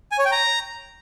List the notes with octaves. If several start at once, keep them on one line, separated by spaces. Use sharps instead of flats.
G#5
C#5
G5
A#5